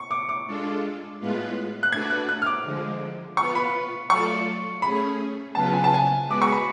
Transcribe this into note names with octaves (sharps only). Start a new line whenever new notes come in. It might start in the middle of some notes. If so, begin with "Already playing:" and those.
Already playing: C#6
D6
D6
G#3 D4 F4 A4
A2 G#3 B3 F4 B4
F#6
A3 D4 F#4 B4 D5 G#6
F#6
F#6
F6
D6
D3 F3 G#3
B3 F4 B4 C#6
B5
F#3 A3 F4 A4 D5 C#6
A3 C#4 G#4 B5
C#3 F#3 B3 F4 B4 A5
G#5
A5
G#5
G#3 B3 F#4 B4 D6
C#6
B5